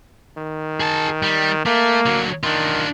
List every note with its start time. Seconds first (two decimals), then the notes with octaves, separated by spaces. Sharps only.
0.38 D#3
0.80 G#4 A5
1.23 G3
1.66 A3 A#3
2.06 D3 F#3
2.43 D#3 D4 F4